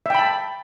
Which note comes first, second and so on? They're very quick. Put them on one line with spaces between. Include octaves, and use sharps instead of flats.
E5 G5 B5 A5